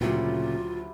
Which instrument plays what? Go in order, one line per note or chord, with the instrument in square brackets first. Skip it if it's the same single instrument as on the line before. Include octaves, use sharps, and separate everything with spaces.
[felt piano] D2 F#3 [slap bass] A#2 C#3 [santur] E4 G4 C5 [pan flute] F4